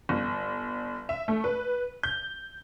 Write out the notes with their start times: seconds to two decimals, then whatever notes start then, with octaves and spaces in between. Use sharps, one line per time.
0.09 G1
1.09 E5
1.28 A3
1.44 B4
2.03 G6